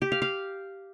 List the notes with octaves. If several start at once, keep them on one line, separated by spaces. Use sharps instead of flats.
G4
F5
F5